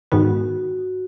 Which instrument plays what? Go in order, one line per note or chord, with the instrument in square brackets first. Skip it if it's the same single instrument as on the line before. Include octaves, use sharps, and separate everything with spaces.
[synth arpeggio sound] G#2 D#3 G#3 B3 [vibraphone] F#4